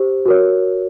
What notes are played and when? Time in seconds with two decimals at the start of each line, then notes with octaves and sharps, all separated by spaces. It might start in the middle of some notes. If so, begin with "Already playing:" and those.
Already playing: G4 C5
0.26 F#4 A#4 C#5